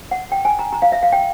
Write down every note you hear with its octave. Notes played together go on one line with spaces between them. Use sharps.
F#5
G5
G#5
A#5
A#5
F5
E5
F5
G5